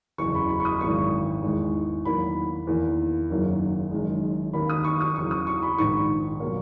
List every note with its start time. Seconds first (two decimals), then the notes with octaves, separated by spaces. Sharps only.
0.18 F#1 E2 C#3 C#6
0.35 B5
0.49 B5
0.60 C#6
0.65 D#6
0.81 G#1 F#2 E3 G#3 C#6
1.43 E2 D#3 G#3
2.05 E2 D#3 F#3 A#3 B5
2.67 E2 D#3 A#3
3.30 F#1 F#2 D#3 F#3 A#3
3.91 F#1 F#2 D#3 G#3
4.53 D#2 D#3 A#3 B5
4.70 D#6
4.85 C#6
5.01 D#6
5.16 E2 C#3 F#3 C#6
5.31 D#6
5.47 C#6
5.63 B5
5.78 A#1 G#2 D#3 C#6
6.40 B2 F#3 A#3